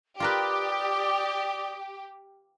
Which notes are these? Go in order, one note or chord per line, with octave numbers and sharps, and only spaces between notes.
F4 G4 A#4 B4 D5 D6 D#6